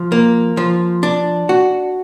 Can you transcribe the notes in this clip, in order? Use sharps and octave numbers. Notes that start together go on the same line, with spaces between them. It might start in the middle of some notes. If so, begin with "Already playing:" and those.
Already playing: F3
A#3
F3
D4
F#4